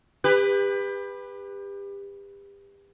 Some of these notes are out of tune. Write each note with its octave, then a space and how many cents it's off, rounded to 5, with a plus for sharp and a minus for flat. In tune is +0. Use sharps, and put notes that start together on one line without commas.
G4 +30 B4 +0